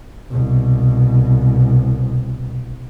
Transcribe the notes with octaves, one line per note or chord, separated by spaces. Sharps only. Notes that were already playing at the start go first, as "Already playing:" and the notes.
C2 B2